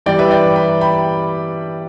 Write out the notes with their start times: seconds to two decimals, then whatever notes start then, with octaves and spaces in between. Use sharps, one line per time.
0.06 G2 E3 G3 D5 G5
0.19 B4 E5
0.31 D5 G5
0.56 B5
0.81 G5 B5